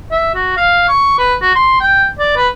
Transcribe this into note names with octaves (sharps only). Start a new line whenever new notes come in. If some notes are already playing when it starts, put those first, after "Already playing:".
E5
F#4
F5
C#6
B4
F#4
C6
G5
D5
B4